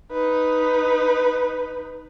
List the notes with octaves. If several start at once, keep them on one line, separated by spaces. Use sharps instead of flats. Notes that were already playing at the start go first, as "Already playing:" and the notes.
D#4 B4